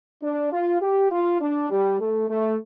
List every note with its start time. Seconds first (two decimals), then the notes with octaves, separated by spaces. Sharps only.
0.23 D4
0.52 F4
0.81 G4
1.11 F4
1.41 D4
1.70 G3
2.00 A3
2.29 A3